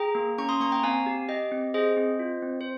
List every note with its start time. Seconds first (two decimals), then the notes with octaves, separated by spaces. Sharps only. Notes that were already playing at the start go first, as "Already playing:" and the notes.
Already playing: G#4 G5 A#5
0.15 A#3
0.38 C#4 A#5 C#6
0.49 C6 D#6
0.60 A#3 A#5 C#6
0.72 G5 A#5
0.83 C4 F5 G#5
1.06 G4
1.28 G4 D#5 G5
1.52 C4
1.74 G#4 C5 D#5
1.97 C4
2.19 F4
2.42 C4
2.61 C5